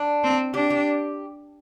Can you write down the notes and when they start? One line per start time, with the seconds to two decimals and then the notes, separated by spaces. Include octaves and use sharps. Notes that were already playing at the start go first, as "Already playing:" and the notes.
Already playing: D4
0.24 C4
0.54 D4 G4
0.70 G4